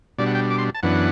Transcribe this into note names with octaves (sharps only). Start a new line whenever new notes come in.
B2 G3 D4 D5
F#5
G5
D6
C6
A5
F#2 E3 B3 D4 F#5